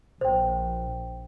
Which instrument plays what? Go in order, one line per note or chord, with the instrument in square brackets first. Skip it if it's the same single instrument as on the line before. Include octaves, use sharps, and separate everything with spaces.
[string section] A#1 [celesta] C5 G5